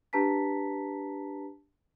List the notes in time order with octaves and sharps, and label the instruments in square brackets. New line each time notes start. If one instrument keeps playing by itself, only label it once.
[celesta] D4 G4 B4 A5 A#5 B6